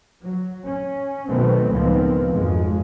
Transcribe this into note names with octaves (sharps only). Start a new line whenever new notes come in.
F#3
C#4
B2 D#3 F#3 A3 B3 C4
C#2 A2 D#3 F3 B3 C4
G#1 F2 F3 G#3